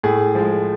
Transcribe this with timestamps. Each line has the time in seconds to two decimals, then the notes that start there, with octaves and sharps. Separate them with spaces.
0.04 A2 G#4
0.35 F3 G#3